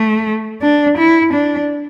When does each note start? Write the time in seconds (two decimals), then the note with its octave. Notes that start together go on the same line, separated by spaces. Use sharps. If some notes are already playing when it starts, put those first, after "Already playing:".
Already playing: A3
0.62 D4
0.97 E4
1.33 D4